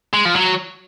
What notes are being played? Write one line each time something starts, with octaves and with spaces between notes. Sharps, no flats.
G#3
F3
F#3